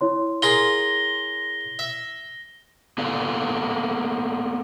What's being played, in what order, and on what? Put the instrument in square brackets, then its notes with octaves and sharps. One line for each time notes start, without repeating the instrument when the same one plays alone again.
[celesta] E4 C#5 C6
[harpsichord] F4 G#4 A#4 [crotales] A#6 G7
[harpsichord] E5
[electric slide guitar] A#3 B3 A4 D5 F5